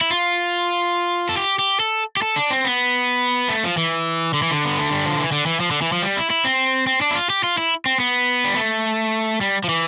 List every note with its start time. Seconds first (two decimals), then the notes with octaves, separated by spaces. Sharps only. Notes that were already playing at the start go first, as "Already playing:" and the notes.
0.01 E4
0.10 F4
1.29 A4
1.37 G4
1.59 G4
1.80 A4
2.17 G4
2.22 A4
2.36 D4
2.50 C4
2.65 B3
3.49 A3
3.63 F3
3.77 E3
4.34 D3
4.42 E3
4.51 D3
4.65 B3
4.79 A3
4.91 G3
5.05 F3
5.18 E3
5.32 D3
5.46 E3
5.60 F3
5.71 D3
5.82 E3
5.92 F3
6.02 G3
6.17 E4
6.30 E4
6.44 C4
6.87 C4
7.01 D4
7.11 E4
7.15 F4
7.30 G4
7.44 F4
7.58 E4
7.86 C4
8.00 B3
8.44 G3
8.56 A3
9.41 G3
9.64 F3
9.69 E3